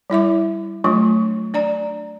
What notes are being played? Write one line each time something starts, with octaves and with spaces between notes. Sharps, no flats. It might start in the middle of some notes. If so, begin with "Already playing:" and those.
G3 E4 E5 D6
F#3 A3 D4 F4
D4 D5 A#5